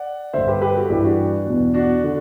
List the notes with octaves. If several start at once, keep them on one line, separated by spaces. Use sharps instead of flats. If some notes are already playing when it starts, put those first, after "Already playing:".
Already playing: D5 F#5
G2 D3 C5 E5
G4 B4
G4 B4
F#4 A4
G2 E3 E4 G4
D4 F#4
E2 B2
D4 F#4
D3